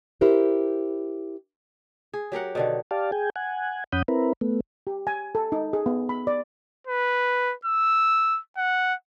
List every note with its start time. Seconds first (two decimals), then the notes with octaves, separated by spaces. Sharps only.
0.21 E4 G4 A#4 C5
2.14 G#4
2.32 F#3 G4 A#4 F#5
2.55 B2 D3 D#3
2.91 G4 D5 F5 A5
3.12 G#4 G5 G#5
3.36 F#5 G#5
3.93 F2 C#4 F#5 B5 D#6 G6
4.08 C4 E4 A#4 B4
4.41 A3 B3
4.87 G4
5.07 G#5
5.35 A4
5.52 D#4
5.73 G#4
5.86 B3
6.09 B5
6.27 D5
6.87 B4
7.65 E6
8.58 F#5